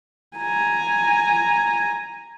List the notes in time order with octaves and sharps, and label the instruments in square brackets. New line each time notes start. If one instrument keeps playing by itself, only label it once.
[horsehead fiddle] G#5 A#5